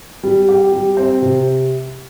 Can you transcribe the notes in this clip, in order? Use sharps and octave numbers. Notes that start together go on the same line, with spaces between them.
G3
G4
G3
C4
C3